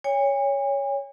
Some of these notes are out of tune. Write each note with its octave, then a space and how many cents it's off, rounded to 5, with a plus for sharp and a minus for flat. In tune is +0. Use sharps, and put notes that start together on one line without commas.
C#5 +10 G#5 -45